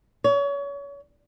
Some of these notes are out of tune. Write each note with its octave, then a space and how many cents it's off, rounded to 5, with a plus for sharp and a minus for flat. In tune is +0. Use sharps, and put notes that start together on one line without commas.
C#5 +30